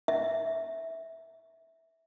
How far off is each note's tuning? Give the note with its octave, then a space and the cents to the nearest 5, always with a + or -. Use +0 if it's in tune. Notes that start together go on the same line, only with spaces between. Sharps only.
E5 -10